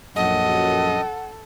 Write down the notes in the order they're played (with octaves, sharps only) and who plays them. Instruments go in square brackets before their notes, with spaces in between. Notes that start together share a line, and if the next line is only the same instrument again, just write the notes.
[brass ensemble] A#1 F#2 F#3 [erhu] A4 [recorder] D#5 [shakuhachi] F#5